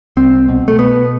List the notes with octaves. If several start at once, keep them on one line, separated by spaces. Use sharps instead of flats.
C2 C4
B2
A3
B2 B3